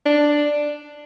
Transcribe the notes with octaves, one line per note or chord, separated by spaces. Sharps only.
D4